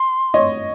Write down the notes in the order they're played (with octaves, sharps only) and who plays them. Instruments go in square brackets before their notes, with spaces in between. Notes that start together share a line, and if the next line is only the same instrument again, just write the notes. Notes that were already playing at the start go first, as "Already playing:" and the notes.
Already playing: [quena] C6
[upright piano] C#5 D#5